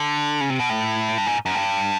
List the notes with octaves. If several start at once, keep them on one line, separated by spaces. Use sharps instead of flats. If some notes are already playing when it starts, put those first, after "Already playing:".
Already playing: D3
C#3
C3
B2
A2
G2
G#2
F#2
G2